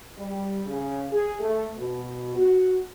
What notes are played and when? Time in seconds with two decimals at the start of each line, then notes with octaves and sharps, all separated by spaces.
0.18 G3
0.67 C#3
1.11 G#4
1.40 A3
1.78 B2
2.35 F#4